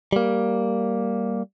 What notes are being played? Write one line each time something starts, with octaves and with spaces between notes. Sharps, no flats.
G3 A#3